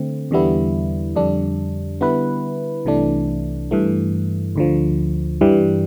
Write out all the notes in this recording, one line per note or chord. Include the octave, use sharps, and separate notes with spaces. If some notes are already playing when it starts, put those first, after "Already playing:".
Already playing: D3 A3 C4
E2 D3 G3 B3 E4
F2 D3 G3 D4
D3 G3 B3 E4 B4
C2 C3 E3 A3 D4
G2 E3 A3
D2 D3 F3
G2 E3 G3